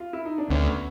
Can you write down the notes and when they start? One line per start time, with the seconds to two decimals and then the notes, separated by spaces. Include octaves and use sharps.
0.00 F4
0.13 E4
0.25 D#4
0.38 D4
0.50 D2 B3 C#4